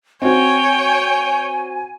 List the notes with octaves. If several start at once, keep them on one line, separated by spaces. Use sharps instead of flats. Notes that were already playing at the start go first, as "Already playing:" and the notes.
C4 F#4 C#5 G5 G#5